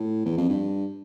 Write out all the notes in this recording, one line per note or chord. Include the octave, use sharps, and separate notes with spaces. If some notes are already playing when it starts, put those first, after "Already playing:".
Already playing: A2
E2
F2
G2